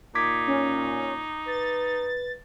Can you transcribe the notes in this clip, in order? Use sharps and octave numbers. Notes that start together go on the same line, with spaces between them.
A#2 D#4 D6 G#6 B6
C#4
B4 A6